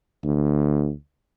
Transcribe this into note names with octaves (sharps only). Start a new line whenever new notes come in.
D2